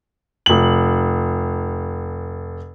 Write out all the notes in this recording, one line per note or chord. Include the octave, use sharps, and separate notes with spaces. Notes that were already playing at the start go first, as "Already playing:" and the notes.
F1 F#7